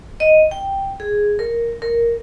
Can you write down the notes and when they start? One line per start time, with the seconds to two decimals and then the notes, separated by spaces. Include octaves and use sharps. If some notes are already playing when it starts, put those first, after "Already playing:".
0.20 D#5
0.51 G5
1.00 G#4
1.39 A#4
1.82 A#4